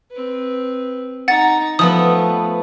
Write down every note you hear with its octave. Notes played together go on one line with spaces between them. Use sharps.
C4 B4
D#4 F#5 A#5 A6
F3 A3 B3 B4 D#6